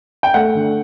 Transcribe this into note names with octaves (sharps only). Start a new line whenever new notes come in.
G5
A3 F#5
D3